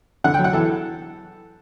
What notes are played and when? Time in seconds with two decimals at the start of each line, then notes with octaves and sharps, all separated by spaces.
0.24 D3 F#5
0.34 F#3 G5
0.44 F#5
0.53 E2 A4